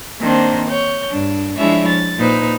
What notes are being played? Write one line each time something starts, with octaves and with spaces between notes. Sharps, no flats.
D#3 A#3 C4 D4 C5
C#5 G6
G2 D4
F3 G#3 D4 E4 C#5 E5
A6
A#2 D#4 B4 C5